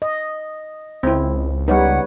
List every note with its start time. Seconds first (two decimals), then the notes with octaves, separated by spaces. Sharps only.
0.02 D#5
1.03 C#2 C4 E4
1.68 G3 B3 D#4 B4 C#5 F#5